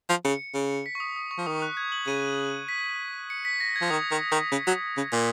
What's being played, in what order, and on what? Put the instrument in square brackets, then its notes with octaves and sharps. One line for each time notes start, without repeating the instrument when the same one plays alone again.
[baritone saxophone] F3
[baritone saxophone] C#3 [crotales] C#7
[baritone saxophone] C#3
[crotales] B6
C#6
D#6
D#6
C#6
[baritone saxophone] F3
[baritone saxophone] D#3 [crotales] D#6
[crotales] F#6
G#6
F#7
[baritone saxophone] C#3 [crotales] D#7
[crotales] B6
C#7
B6
A#6
G#6
[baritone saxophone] F3
[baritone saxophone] D#3 [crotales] D#6
[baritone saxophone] D#3
D#3
C#3
F#3
C#3
A#2